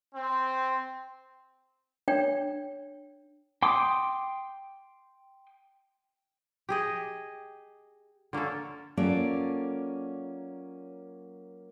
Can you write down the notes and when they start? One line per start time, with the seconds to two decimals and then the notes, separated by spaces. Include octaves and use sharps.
0.15 C4
2.08 D4 C#5 G5
3.63 G5 C6 D6 D#6
6.69 G4 G#4 D#5
8.33 D3 A#3 C#4 A4
8.97 F#3 A#3 C#4 F4 A4 D5